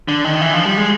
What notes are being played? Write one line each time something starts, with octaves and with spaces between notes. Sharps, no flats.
D3
D#3
E3
F3
G3
G#3